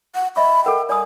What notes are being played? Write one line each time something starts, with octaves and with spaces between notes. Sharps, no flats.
F#5
D#5 E5 B5 C#6
A4 A#4 F#5 G5
D5 G#5 D#6